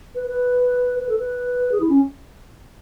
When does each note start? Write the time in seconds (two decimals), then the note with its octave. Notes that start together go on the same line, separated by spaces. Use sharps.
0.15 B4
0.27 B4
0.99 B4
1.09 A4
1.19 B4
1.72 G#4
1.80 E4
1.89 C#4